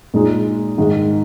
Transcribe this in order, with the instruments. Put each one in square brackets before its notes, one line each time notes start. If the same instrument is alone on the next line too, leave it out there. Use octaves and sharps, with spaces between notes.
[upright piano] A#2 G#3 D#4 G#4
G#2 D#3 G#3